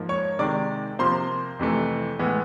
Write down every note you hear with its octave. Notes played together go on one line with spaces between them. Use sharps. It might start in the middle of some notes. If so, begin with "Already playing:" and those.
Already playing: G#2 F3 A#3
C#5 C#6
C3 D#3 G#3 D5 D6
C3 F3 A#3 C5 C6
F2 C3 E3 A3
A2 E3 G#3 B3